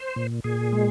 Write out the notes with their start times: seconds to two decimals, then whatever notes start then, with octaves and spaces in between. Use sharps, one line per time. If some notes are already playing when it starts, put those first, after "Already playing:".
Already playing: C5
0.16 A#2
0.44 A#2 G#4
0.73 G#3